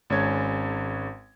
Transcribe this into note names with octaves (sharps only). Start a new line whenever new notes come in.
G#1 G#3 C#4 C#5 G#6